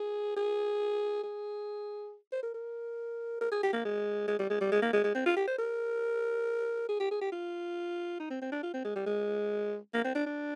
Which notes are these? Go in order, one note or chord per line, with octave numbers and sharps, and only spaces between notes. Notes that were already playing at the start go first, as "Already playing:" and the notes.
Already playing: G#4
G#4
G#4
C5
A#4
A#4
A#4
G#4
G4
A#3
G#3
G#3
G3
G#3
G3
G#3
A#3
G#3
G#3
C4
F4
G4
C5
A#4
G#4
G4
G#4
G4
F4
D#4
C4
C4
D4
F4
C4
G#3
G3
G#3
A#3
C4
D4
D4